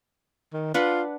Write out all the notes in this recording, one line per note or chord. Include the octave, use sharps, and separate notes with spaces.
D#3
D4 F4 B4 F#5